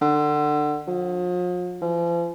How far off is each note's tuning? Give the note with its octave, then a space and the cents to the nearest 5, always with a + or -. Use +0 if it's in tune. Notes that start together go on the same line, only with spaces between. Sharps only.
D3 +25
F3 +40
F3 -40